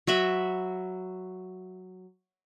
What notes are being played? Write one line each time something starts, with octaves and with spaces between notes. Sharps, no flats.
F#3 F#4 E5 B5